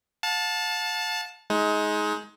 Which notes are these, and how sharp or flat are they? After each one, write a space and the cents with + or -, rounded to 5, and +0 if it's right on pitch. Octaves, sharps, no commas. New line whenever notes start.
F5 +45 A5 -5
G#3 +20 D#4 +25